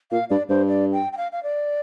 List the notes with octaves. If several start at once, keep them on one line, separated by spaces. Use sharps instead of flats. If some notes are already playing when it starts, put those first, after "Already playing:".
A#2 F5
G2 D5
G2 C5
D5
G5
G5
F5
F5
D5